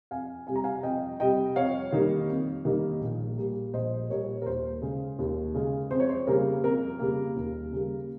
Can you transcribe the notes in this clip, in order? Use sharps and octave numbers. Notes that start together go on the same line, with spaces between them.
F2 F5 G#5
C3 G3 G#5
A#5
F5 G#5
F2 D#5 G5
C3 G3 D#5 G5
F2 C#5 F5
D#3 G3 A#3
F2
D#3 G3 A#3
A#1
A#2 G3 A#3
A#1 C5 D#5
A#2 G3 A#3 A#4 C#5
A#4
D#2 C5
C#3 G#3
D#2
C#3 G#3
F2 C5
C#5
C5
C#3 G3 A#3 A#4
F2 A#4
C#3 G3 A#3
D#2
C#3 G3 A#3